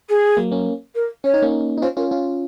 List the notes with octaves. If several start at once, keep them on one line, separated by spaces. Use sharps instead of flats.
G#4
F#3 A#3
A#3 C#4
A#4
C#4 C#5
D#4
A#3 C#4
D#4
C#4 F4 C5
C#4 F4 A#4
C#4 F4